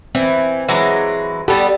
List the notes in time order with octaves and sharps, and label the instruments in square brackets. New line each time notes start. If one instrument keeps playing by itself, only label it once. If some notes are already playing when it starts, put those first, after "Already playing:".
[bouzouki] E3 [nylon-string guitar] C4
[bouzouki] E3 F#3 G#3
[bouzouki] G3 B3 [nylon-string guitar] G4 A4